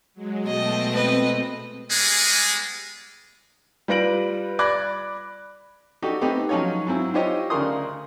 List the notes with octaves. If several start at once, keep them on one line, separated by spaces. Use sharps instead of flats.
F#3 G#3
B2 G#3 A3 D#5 G5 A5
C4 B4 D#5
G3 G#3 B3 G#4
G3 F4 B4 A#6 D7 F#7
D5 B5 D6 F#6 G#6 A#6
D4 D#4 F#4 G4 A4
A3 B3 C4 D#4 G4
F3 F#3 C#4 D#4 F4 C#5
G#2 F#3 C4 E4
E4 F4 G4 C5 C#5 D#5
D2 C#3 D4 A#4 C6 D#6